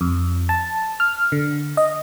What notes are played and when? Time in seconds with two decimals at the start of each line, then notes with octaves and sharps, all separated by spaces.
0.01 F2
0.49 A5
1.00 F6
1.32 D3
1.77 D#5